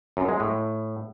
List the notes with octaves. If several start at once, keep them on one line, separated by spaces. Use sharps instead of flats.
F#2
G#3
A2